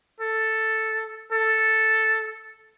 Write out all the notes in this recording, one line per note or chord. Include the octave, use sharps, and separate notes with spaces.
A4
A4